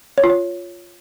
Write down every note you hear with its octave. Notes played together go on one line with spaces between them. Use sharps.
C#5
F4
C#5